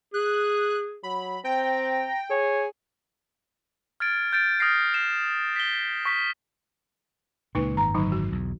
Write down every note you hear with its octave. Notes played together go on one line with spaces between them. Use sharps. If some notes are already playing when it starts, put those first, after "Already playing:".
G#4 F#6
F#3 B5
C4 G5 A#5
G#4 C#5
F6 G#6 A6 D7
G6 A6 D7
D#6 F6 G6 A#6 C7 D7
C7 E7
B6 G7
C#6 B6
C#2 A#2 A#3 D#4 B4
G#1 F#2 A#5
D3 F#3 D#4
F#4
B1 E2